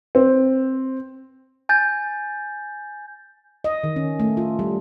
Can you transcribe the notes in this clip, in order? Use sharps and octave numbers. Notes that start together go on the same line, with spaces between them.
C4
G#5 G6 A6
D#5
D#3
C#4
A3
F4
G3